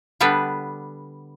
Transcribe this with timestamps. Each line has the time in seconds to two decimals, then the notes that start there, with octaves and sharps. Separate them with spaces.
0.20 D3 G3 B3 D4 B4